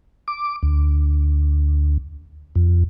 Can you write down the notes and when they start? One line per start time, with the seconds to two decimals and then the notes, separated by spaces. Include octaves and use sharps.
0.28 D6
0.63 D2
2.55 F2